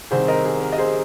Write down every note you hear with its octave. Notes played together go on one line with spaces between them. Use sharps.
C2 C3 D#3 C4 G#4 C5
A#4 D#5
G#4
A#4
D#5
G#4 C5